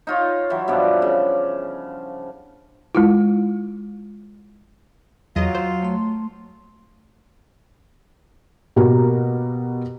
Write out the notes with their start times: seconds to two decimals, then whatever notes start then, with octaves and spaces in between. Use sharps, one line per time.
0.07 D#4 F4 C#5
0.50 E3 F#3
0.68 G2 B2 F3 D5
1.02 C#3
2.95 G#3 E4 F4
5.36 E2 F#3 F4 D#5 D#6
5.55 C5
5.83 A3 C6
8.76 B2 A#3 F#4 G4 A#4